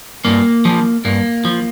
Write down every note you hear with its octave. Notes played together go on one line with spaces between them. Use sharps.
G2 A#3
F3
G2 A#3
F3